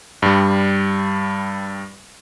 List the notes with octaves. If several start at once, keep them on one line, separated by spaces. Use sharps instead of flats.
G2 G3